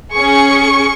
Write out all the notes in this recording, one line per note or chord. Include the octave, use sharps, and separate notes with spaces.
C#4 G#4 C#6